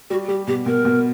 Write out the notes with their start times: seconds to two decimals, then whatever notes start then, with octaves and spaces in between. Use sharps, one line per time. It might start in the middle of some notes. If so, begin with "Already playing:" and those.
0.10 G3 F#4
0.28 G3 G4
0.47 B2 G4
0.66 B2 A#4
0.85 B2